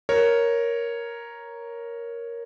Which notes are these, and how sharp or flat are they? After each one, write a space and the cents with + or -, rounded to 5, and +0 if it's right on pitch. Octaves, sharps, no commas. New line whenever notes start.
A#4 +5 C#5 +0